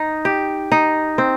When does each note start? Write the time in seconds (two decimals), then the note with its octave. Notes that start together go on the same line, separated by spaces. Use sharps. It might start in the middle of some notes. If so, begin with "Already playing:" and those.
Already playing: D#4
0.25 G4
0.72 D#4
1.18 C4